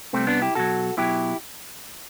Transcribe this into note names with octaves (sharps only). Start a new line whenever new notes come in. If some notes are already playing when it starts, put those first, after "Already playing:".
C3 G3 A3 C4
B3 D4
E4 G4
B2 F#3 F#4 A4
B2 F#3 E4 G4